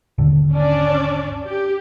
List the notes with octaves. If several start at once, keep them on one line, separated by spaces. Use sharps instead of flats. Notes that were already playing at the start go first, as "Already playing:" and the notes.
G#1 D#2 D3
C#4 D4 D5
G4